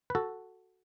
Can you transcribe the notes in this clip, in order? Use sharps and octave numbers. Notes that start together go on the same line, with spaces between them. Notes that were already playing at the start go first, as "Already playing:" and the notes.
B4
F#4 A4